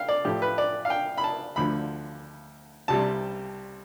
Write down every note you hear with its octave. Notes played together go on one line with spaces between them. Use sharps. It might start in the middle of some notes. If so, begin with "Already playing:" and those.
Already playing: F5 G5
D5
A2 F3 A3 G4
B4
D5
F5
G5
B5
A5
D2 D3 F3 B5
C2 C3 G3 A5